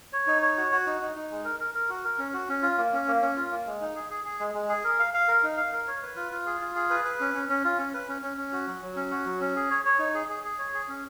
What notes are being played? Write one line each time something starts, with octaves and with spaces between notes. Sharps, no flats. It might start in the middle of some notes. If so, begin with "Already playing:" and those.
C#5
D#4
C#5
F#4
F#4
D#4
D#4
D#4
G#3
A#4
A#4
A#4
F#4
A#4
C#4
F#4
C#4
F4
A#3
C#4
A#3
C#4
F4
A#3
G#3
D#4
G#4
G#4
G#4
G#3
G#3
G#4
A#4
F5
F5
A#4
D#4
F5
A#4
C#5
B4
F4
F4
G#4
F4
G#4
B4
B4
C#4
C#4
C#4
F4
C#4
B4
C#4
C#4
C#4
F#4
F#3
F#3
C#4
F#4
F#3
C#4
G#4
C#5
C#5
D#4
G#4
G#4
G#4
C#5
G#4
C#4